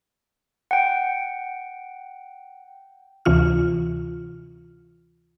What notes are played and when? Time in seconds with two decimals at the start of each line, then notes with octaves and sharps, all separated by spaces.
0.71 F#5 G5
3.25 D2 C3 E3 F4 F6